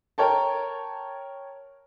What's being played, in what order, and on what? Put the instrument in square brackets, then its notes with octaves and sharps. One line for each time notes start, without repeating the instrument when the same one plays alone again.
[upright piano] A#4 C#5 G5 A5